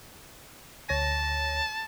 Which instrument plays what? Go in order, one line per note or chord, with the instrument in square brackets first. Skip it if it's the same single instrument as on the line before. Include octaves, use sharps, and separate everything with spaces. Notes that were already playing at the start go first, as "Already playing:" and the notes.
[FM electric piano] D2 C#5 A#6 [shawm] A5